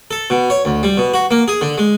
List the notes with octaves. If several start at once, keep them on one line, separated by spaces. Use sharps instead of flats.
A4
B2
C#5
D2
G3
B2
F#4
A#3
G#4
D3
G#3